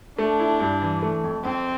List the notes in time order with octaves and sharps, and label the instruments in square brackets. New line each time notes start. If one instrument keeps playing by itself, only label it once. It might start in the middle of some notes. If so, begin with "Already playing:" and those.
[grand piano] A3 [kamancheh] D4
[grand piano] E4
G2
E3
A3
F2
[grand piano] F2 [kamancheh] C4